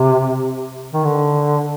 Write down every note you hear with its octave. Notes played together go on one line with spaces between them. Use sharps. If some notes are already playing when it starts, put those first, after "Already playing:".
Already playing: C3
D#3
D3